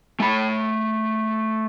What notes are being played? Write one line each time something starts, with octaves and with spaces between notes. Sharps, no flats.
A3 B5